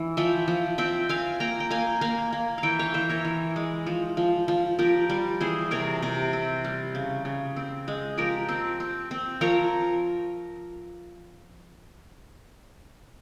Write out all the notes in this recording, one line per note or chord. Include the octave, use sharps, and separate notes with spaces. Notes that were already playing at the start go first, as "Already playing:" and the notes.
Already playing: E3
F3 E5 G5
F3
C4 E5 G5
C4 F5 G#5
A#3 G5 A#5
G5
A#3 F5 G#5
A#3 F5 G#5
A#3
F5
E3 E5 G5
C#5 F5
E3 C5 E5
A#4 C#5
E3
G#3
F3
F3
F3
F3 G4 A#4
G3
E3 G#4 C5
C3 A#4 C#5
C3
C4
G3
C#3
C#3
C4
G#3
F3 G4 A#4
C4
C4
C4
F3 A#4 C#5